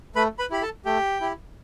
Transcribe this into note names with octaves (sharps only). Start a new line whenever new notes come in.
A3 B4 B5
B4 B5
E4 G4 B5
A4 A5
A3 G4 G5
E4 G4